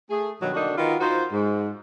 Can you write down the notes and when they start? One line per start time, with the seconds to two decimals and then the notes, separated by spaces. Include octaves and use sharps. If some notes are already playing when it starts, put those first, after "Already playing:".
0.10 A3 G#4
0.40 G2 B2 D#3 F#3
0.54 D3 A#3 D4 D#4 F#4
0.77 D#3 D#4 F4 F#4 B4
1.00 D#4 F4 F#4 C5
1.31 G#2